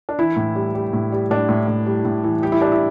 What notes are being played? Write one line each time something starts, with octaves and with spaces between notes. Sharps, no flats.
D4
E3 E4
A2
G3
G3
A2
G3
A2 D4
A2
A2
G3
A2
E3
G3 G4
E4
G3 D4
E4